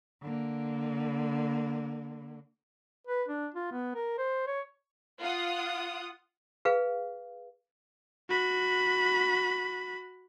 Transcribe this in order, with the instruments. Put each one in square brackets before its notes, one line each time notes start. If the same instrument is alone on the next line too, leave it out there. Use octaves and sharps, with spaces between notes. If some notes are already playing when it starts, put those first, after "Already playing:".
[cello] D3 A#3
[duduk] B4
D4
F4
B3
A#4
C5
C#5
[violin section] F4 F#5 D#6
[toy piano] G#4 B4 F5
[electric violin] F#4 B5